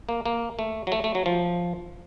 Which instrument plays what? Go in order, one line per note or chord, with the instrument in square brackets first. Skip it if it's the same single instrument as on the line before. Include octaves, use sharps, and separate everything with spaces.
[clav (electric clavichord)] A#3
A#3
A3
F#3
A3
A3
F#3
F3